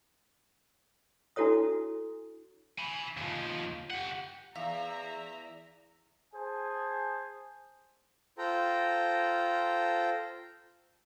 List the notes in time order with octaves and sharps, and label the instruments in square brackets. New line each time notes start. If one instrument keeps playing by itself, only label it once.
[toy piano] D4 E4 F#4 A4 C#5 D#6
[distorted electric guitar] G#5 B5
D#2 F3
G4 F#5
[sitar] E2 [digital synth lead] E5 [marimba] F5 [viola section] A#5
[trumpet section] G#4 C5 G#5 A5
[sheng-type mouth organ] F4 A4 C5 G5 A#5